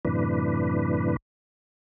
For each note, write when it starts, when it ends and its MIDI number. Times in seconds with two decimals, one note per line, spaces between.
0.05 1.16 42
0.05 1.16 45
0.05 1.16 48
0.05 1.16 52
0.05 1.16 62
0.05 1.16 71